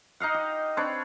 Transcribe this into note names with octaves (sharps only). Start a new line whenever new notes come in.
D#4 D#5 F5 F#5
G4
C4 D4 B4 C#5